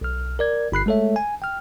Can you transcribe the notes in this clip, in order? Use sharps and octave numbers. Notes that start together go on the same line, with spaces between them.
B1 F6
A#4 D5 G#6
G1 B5 F#6 C7
G#3 A3 A4 C#5 E5
G#5
G5 F6